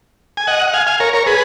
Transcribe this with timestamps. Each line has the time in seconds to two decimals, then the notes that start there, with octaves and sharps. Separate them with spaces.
0.37 G#5
0.47 D#5 F#5
0.67 F#5
0.74 F5 G#5
0.87 F5 G#5
1.00 A#4 C#5
1.13 A#4 C#5
1.26 G#4 B4